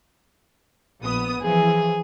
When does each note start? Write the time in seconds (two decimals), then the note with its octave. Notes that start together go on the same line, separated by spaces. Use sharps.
1.02 A#1 B3 D#6
1.42 E3 F3 G#4